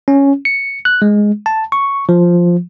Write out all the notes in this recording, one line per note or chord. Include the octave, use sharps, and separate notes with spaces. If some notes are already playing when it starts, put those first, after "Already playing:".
C#4
C#7
F#6
G#3
A5
C#6
F3